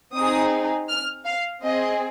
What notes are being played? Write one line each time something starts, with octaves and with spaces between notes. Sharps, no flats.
C4 D#4 G#4 D#6
F6
F5
C4 G#4 D#5